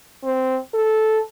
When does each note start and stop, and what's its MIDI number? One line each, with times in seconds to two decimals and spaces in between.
0.24 0.58 60
0.74 1.19 69